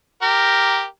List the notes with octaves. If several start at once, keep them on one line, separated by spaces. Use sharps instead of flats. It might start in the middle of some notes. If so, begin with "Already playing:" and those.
G4 A#4